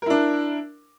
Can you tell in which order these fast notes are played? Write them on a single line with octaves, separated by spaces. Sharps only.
A#4 E4 D4